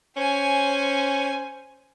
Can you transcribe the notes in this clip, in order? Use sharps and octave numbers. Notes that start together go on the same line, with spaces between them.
C#4 C5 G#5